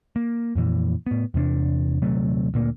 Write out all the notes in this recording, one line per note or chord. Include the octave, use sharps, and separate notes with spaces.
A#3
F2 A#2 E3
A2 B3
E2 C3 B3 D4
D#1 C3 F#3 A3
D2 A#2 A#3